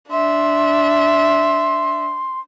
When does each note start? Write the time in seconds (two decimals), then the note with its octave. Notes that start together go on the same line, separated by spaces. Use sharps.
0.11 D4 E5 C6